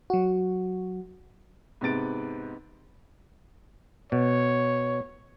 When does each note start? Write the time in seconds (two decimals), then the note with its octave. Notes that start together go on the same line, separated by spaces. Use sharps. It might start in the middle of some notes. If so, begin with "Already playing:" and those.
0.10 F#3 F#4
1.81 G#2 C3 B3 A6 D7
4.12 B2 C#5